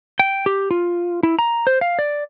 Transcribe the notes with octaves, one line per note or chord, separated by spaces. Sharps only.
G5
G4
F4
E4
A#5
C5
F5
D5